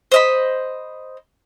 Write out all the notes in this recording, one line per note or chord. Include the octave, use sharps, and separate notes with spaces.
C5 D#5 B5